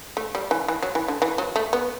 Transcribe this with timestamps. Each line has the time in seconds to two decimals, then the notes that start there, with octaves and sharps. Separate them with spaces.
0.17 A3
0.35 G3
0.51 E3
0.68 E3
0.83 F#3
0.95 E3
1.08 D3
1.22 E3
1.38 F#3
1.56 A3
1.73 B3